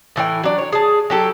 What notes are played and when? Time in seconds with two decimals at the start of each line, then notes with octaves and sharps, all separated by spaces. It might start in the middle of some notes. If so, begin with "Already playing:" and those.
0.16 A2 E3 G#4 G5
0.43 F#3 D4
0.58 C#5
0.72 G#4 A5
1.10 F#3 G4 A4